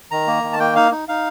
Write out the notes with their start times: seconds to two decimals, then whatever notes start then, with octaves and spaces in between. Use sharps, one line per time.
0.11 D#3 A#5
0.27 A#3
0.44 D#3
0.53 A5
0.60 A#3 G5
0.76 D#4 F5
0.92 D#4
1.09 D#4 F5